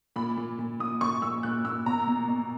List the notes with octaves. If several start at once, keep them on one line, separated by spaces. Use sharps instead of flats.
A#2 B5
A#2
A#2
A#2 D#6
A#2 C#6
A#2 E6
A#2 F#6
A#2 E6
B2 A#5
B2
B2